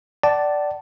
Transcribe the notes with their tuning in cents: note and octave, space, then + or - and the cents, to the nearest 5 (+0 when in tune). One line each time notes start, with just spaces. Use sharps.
D5 +0 F#5 +40 A5 -5